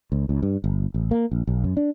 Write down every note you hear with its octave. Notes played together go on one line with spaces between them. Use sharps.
C#2
C#2
G2
G1
A1
A#3
A#1
B1
F#2
D4